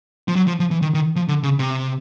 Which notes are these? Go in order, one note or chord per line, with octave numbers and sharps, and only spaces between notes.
F3
F#3
F3
F3
E3
D#3
D#3
F3
D3
C#3
C3